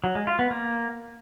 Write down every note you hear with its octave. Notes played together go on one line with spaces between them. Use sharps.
F#3
G#3
F4
B3
A#3